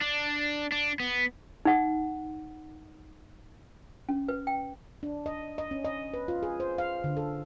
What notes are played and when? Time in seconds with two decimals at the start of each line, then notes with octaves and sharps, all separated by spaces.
0.01 D4
0.72 D4
1.00 B3
1.65 D#4 F#5
4.09 C#4
4.28 B4
4.47 G5
5.03 D4
5.26 D#5
5.58 D#5
5.71 C#4
5.85 D#5
6.14 B4
6.28 F4
6.43 G#4
6.60 C5
6.78 F5
7.04 D3
7.17 A4